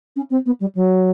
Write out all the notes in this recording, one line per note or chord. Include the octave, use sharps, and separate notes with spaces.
C#4
C4
B3
G3
F#3